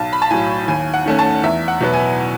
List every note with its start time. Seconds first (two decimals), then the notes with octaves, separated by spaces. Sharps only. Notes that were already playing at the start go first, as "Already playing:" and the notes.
Already playing: B1 A5
0.13 B5
0.22 A5
0.30 A2 F#3 G#5
0.68 D#2 G#5
0.94 F#5
1.06 D#3 A3 C#4
1.19 A5
1.43 E2 E5
1.68 F#5
1.81 B2 F#3 B3
1.94 G#5